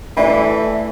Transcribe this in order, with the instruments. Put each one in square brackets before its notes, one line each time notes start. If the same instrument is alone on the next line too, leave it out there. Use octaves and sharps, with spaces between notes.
[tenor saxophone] E3 [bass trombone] A3 [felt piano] D5 E5 B5